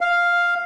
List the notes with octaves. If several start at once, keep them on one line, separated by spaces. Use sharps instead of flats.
F5